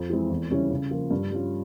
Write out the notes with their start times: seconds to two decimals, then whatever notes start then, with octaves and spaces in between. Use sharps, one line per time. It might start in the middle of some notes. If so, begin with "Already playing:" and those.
Already playing: F2
0.10 E3 G#3 C4 E4
0.30 E2
0.50 C#3 G3 C#4 E4
0.70 C#3
0.91 F3 A#3 F4
1.11 G2
1.31 G3 C#4 F4